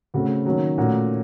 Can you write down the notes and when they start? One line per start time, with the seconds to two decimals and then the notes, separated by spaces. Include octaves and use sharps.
0.14 C#3 A3 C4 F#4
0.45 D#3 F#3 A#3 C#4
0.78 A#2 A3 C#4 F#4